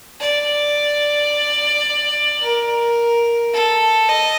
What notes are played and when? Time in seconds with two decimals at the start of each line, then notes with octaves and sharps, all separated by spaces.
0.20 D5
2.42 A#4
3.53 A4
4.08 D#5